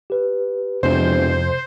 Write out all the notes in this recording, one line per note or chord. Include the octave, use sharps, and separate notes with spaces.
G4 B4
E1 F2 C3 C5